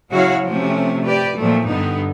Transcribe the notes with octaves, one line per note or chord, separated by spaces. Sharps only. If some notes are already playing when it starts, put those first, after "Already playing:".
C#3 F#3 E4 F#4 C#5 F5
C3 F3 A3 C#4
G4 B4 D5
A#2 D#3 F3 F#3 A3
G2 D3 B3 D#4